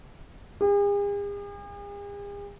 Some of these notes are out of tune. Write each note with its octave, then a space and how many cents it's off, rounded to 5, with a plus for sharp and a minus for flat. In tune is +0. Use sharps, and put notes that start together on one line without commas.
G#4 -45